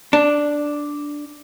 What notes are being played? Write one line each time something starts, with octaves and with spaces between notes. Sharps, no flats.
D4